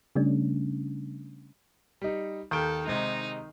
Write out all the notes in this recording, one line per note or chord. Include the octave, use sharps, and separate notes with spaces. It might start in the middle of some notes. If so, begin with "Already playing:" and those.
C#3 G3 A3 C#4 D4
G3 D#4
D#2 D#3 A4 G5
C3 G#3 D#4